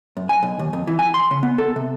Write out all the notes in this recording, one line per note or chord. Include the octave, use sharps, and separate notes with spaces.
F#2
G#5
B1
D#2
F2
E3
G#5
C6
C#3
B3
A4
C3